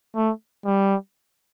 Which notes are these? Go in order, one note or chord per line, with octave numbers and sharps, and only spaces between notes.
A3
G3